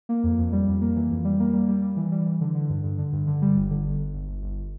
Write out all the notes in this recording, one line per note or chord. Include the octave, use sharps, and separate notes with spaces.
A#3
F2
F2
G3
F2
A#3
E3
F2
G3
A#3
G3
G3
G3
E3
G3
E3
D3
D3
G2
G2
D3
G2
D3
G3
G1
D3
G1
G1
G1
G1
G1